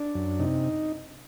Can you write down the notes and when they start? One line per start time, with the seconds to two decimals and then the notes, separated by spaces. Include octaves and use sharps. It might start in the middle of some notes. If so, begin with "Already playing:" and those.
Already playing: D4
0.15 F#2
0.40 C3 D#4